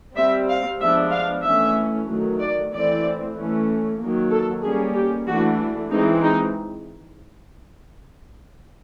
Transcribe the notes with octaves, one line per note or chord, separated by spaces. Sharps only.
G3 C4 E5
F5
F3 G#3 B3 D4 E5
F5
E3 A3 C#4 E5
D#3 F#3 A3
D5
E3 A3 C4 D5
E3 A3 C#4
D#3 F#3 A#3
A4
G3 A#3 C#4 G#4
G4
E3 A3 D4 F#4
E3 G#3 C4 D#4
D#4